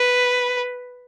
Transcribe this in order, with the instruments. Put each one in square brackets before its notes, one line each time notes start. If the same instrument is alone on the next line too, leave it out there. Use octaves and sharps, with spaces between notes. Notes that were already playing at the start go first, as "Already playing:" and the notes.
Already playing: [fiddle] B4